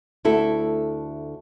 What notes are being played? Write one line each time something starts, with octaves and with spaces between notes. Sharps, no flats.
D2 E4 A4